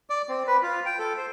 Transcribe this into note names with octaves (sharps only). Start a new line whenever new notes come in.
D5
C4
B4
F4
G5
A4
C5